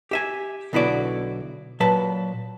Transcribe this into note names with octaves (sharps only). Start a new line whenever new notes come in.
G4 E5 G#5
B1 D3 B3 E4 F#4 D5
A#2 F#3 B4 A5